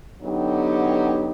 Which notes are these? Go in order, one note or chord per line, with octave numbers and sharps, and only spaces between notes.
D3 F#3 B3 D#4 G4